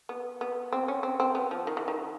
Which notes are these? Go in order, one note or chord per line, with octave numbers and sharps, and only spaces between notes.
B3
B3
C4
C#4
C4
C4
B3
F3
D#3
E3
D#3